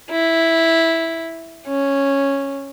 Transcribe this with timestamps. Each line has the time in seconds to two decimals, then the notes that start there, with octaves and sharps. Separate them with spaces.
0.10 E4
1.66 C#4